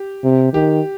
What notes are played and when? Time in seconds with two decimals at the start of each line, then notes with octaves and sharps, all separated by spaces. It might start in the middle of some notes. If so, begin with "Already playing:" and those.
Already playing: G4
0.24 C3
0.53 D#3 G4